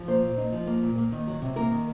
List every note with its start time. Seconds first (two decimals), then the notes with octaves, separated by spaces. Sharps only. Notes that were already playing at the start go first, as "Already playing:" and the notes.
Already playing: F3
0.08 A#3 C5
0.22 A#2
0.38 D#4
0.52 F3
0.67 A#3
0.83 A#2
0.98 A#3
1.12 D#3
1.27 F#3
1.42 C3
1.56 A#3 A#4
1.71 D#3